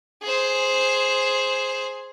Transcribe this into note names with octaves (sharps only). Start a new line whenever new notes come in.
G#4 C5